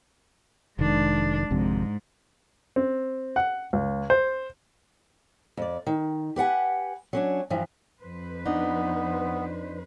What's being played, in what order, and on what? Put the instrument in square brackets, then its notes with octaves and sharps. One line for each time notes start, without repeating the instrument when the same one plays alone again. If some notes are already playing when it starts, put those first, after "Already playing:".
[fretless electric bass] F1 D#3 [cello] G#3 D4
[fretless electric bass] G#1 F2 C3 [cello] G#2
[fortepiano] C4
F#5
C#2
C5
[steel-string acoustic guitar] F2 D5
D#3
G4 B4 F#5 G#5
F#3 C#4 D4
G2 E3 F3
[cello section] F2 B4 C5
[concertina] B3 [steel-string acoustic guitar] D4 D#4